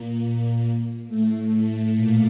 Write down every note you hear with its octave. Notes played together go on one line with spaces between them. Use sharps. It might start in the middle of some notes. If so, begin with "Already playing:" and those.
Already playing: A#2 A#3
A2 A3
A2 A3
A#2 A#3